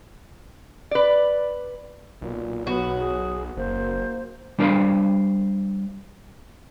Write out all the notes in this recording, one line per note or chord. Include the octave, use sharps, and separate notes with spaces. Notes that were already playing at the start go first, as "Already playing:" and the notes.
B4 D5
B1 A#2
F#3 B3 F#4
G#4
F#1 A#3 C5
G3 D4 A#4 C5 F5 B5